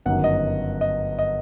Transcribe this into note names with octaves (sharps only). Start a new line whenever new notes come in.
G1 F#2 D#3 F#5
D#5
D#5
D#5